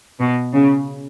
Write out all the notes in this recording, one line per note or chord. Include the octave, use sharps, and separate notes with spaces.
B2
C#3